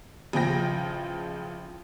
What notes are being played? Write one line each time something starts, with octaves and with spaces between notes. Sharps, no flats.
A1 C#3 F3 G5 A#6